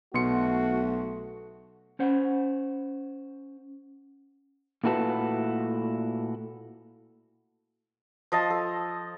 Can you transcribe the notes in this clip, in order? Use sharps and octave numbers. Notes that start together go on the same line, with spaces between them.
B1 B2 A3 F#4 C6 C#7
C#4 C5 F#5
A#2 A3 E4 F#4 A4 B4
F3 D#5 A5
A4